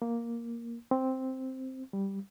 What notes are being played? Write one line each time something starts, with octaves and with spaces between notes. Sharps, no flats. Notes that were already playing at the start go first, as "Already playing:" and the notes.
A#3
C4
G3